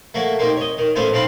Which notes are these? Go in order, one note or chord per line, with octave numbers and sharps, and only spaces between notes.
A3 A#3 F#4 C#5
A#3 C4 D#4 G4
C#5 D#5
D#3
A1 A3 B3 F4 C5 G#5
D#3 C4 A4 F5 B5